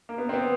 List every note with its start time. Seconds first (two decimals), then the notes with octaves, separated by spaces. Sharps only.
0.09 A#3
0.18 B3
0.29 C4
0.34 B3